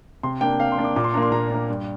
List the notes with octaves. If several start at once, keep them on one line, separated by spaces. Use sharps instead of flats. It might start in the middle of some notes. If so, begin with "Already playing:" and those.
C3 C6
A#3 D4 G5
C3 F5
C6
A#3 D4
D6
A#2 D6
C6
A#3 D4 A#5
C6
A#2 A#5
A#3 D4
G2